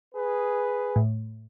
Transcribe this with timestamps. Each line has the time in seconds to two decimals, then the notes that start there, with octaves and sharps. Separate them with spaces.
0.15 G#4 B4
0.96 A2